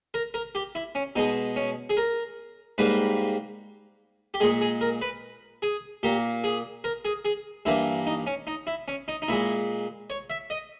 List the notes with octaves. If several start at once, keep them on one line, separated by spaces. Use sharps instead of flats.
A#4
A#4
G4
E4
C#4
B2 G#3 D#4
C#4
G#4
A#4
G#2 G3 A#3 B4
G4
A#2 G#3 G#4
G#4
A#4
B4
G#4
A#2 A#3 G4
G#4
A#4
G#4
G#4
G2 E3 A#3 E4
D#4
C#4
D#4
E4
C#4
D#4
D#4
A#2 G#3 E4
C#5
E5
D#5